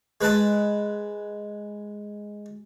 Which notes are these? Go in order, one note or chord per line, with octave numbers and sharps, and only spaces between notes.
G#3 B4 A5 B5